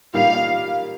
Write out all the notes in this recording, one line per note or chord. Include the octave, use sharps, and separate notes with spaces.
A#2 G3 A#3 D#4 G4 F5